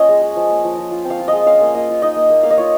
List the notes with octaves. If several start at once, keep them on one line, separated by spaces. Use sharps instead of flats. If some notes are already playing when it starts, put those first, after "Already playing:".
Already playing: A#3 C#4 F4 C#5 D#5
G#3
G#3
F3
A#3
F3
F3
F4
C4
F5
F4
G#3 D#5
C#4 F5
A#3
A#3 D#5
F4
D#4 D#5
A#3
A#3
A#3 F5
D#5
F4 C#5